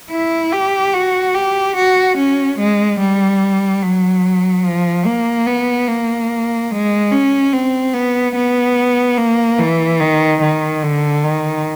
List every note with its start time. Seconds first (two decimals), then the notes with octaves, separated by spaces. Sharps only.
0.10 E4
0.52 G4
0.93 F#4
1.34 G4
1.76 F#4
2.17 C#4
2.58 G#3
2.99 G3
3.82 F#3
4.65 F3
5.05 A#3
5.47 B3
5.88 A#3
6.71 G#3
7.11 C#4
7.53 C4
7.94 B3
8.35 B3
9.18 A#3
9.59 E3
10.00 D#3
10.41 D#3
10.82 D3
11.24 D#3